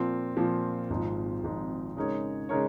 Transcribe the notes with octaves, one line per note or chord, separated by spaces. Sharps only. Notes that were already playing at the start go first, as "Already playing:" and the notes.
Already playing: A#2 F3 C4
A#2 F3 C4
G#1 G#2 F3 C4 D#4
G#1 G#2 F3 C4 D#4
C#3 G#3 D#4 A#4 C#5
C#3 G#3 D#4 A#4 C#5